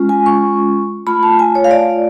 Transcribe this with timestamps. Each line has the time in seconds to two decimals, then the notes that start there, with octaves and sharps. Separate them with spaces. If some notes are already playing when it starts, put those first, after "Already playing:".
Already playing: G#3 C#4 F4
0.09 G#5
0.26 C#6
1.07 A3 F4 B5
1.23 A5
1.39 G#5
1.55 C#5
1.64 F5
1.71 D5